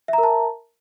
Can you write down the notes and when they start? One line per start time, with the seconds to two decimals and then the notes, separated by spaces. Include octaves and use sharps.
0.08 E5
0.13 A#5
0.18 A#4
0.23 A5